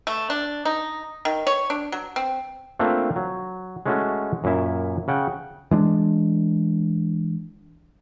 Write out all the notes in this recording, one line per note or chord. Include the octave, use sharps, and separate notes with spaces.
A3
D4
D#4
D#3
C#5
D4
F#3
C4
A3 A#3 C4 D4 F4
F#3
G#3 A3 C#4 E4 F#4 A4
F#2 A#2 E4 E5
C#3 F#5 G5
E3 G#3 D4